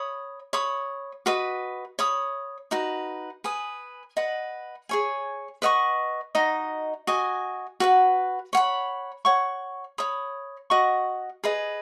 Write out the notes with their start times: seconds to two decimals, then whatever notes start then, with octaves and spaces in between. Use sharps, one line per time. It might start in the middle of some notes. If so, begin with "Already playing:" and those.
Already playing: C#5 B5 D#6
0.53 C#5 B5 D#6
1.26 F#4 B4 D#5
1.99 C#5 B5 D#6
2.71 D#4 F#4 B4
3.44 B4 G#5 D#6
4.17 B4 D#5 F#5
4.89 G#4 C#5 G#5
5.62 B4 D#5 F#5 C#6
6.35 D#4 F#4 D#5
7.07 F#4 D#5 G#5
7.80 F#4 B4 F#5
8.53 C#5 F#5 B5
9.25 C#5 F#5 C#6
9.98 C#5 B5 D#6
10.70 F#4 D#5 F#5 C#6
11.44 G#4 B4 D#5